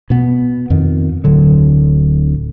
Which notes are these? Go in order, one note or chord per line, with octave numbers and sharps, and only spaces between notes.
B2 B3
F2 D#3
D1 D3 F#3